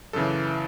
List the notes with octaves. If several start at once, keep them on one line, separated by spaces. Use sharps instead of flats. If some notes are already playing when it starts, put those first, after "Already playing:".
F#2 C#3 E3 A4